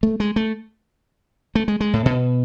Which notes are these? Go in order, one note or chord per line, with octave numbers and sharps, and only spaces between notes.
A3
G#3
A3
A3
G#3
G#3
A2
B2